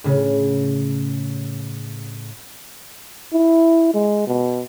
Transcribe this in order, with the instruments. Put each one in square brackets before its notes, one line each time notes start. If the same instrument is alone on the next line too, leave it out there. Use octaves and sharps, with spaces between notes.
[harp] A2 C#3
[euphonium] E4
G#3
B2